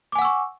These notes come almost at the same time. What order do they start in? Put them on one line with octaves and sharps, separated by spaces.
D6 G#5 F#5 E6 C#6